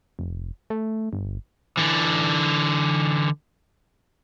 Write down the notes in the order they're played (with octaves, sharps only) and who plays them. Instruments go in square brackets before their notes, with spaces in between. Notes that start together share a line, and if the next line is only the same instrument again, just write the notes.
[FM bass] F1
A3
G1
[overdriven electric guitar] D3 E3